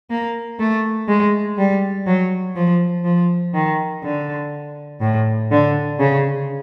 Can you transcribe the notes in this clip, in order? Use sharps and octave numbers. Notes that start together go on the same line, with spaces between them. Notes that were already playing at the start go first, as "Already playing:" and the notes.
A#3
A3
G#3
G3
F#3
F3
F3
D#3
D3
A2
D3
C#3